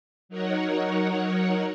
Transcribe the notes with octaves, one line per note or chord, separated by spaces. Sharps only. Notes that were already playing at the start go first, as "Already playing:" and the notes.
F#3 D#4 A#4 C#5 F#5